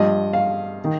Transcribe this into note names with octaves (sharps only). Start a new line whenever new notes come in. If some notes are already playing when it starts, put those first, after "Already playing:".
Already playing: G2 F3 D#5
F5
D#3